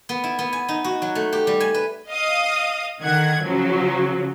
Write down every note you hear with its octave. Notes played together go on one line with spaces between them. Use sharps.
B3
E4
B3
G#5
D#4
F#4
F#3
A3
G4
G3
G#5
B4
D#5 F5 D#6
D3 D#3 F#5 G#6
C#3 F3 F#3